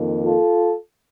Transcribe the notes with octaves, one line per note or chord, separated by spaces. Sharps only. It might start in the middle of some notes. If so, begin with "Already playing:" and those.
Already playing: F2 D#3 A#3
F4 A4